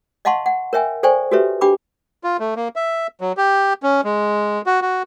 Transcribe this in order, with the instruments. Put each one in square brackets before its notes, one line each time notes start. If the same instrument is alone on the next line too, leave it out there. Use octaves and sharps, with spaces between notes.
[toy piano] D#5 F5 F#5 A5 C6 C#6
F#5
A#4 C#5 E5 G5 G#5
A4 C5 D5 G5 G#5 C#6
F#4 G4 A4 B4 C#5 E5
D4 G4 G5 B5 D6
[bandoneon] F4
A3
A#3
E5
F#3
G4
C#4
G#3
F#4
F#4